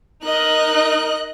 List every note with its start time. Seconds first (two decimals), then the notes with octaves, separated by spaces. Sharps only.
0.23 D#4 A#4 D#5 F#6